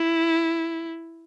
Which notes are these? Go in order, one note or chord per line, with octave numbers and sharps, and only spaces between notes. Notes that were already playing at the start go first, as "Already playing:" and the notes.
Already playing: E4